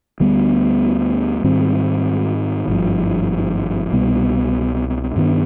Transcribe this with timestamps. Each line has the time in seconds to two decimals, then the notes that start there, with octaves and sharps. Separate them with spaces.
0.20 D2 D3 G3 B3
1.44 G#2 D#3 G3 C4
2.68 G#1 G2 D3 F3
3.92 C2 B2 G3 B3
5.16 G2 D#3 B3 D4